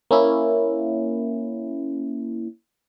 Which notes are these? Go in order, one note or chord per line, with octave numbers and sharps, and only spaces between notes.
A#3 C#4 E4